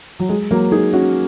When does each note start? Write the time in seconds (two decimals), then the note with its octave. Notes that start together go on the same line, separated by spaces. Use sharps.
0.20 F#3
0.29 G#3
0.51 F#3 A#3
0.72 D#4 G#4
0.93 C#4 F#4